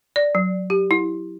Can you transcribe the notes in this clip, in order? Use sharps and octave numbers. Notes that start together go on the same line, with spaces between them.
D5
F#3
G4
E4